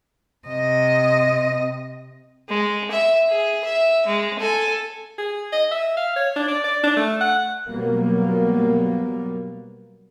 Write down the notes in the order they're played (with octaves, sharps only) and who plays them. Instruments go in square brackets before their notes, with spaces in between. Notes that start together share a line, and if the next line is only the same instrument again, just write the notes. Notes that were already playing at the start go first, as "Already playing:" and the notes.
[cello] C3 D#5
[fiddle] G#3
E5
G#4
E5
G#3
A4 G#5
[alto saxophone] G#4
D#5
E5
F5
C#5
D4
D5
D5
D4
A3
F#5
[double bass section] B2 F#3 G3 A#3 B3